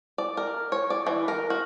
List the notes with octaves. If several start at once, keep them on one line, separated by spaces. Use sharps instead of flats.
D5
A#4
C#5
D5
E3
A#4
F#4